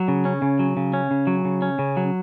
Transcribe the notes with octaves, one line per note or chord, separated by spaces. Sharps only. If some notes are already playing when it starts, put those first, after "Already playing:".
Already playing: F#3
C#3
C#4
C#3
F#3
C#3
C#4
C#3
F#3
C#3
C#4
C#3
F#3